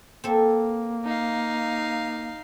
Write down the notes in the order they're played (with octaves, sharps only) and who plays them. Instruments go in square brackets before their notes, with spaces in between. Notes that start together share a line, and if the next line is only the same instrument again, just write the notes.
[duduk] A#3 [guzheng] C4 A4 E5
[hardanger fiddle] D#4 F5